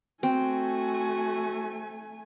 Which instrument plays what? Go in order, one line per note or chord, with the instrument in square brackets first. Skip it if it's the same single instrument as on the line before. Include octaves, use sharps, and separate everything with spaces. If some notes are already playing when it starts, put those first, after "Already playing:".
[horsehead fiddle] A3 G#5 [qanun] C4 [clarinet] F#4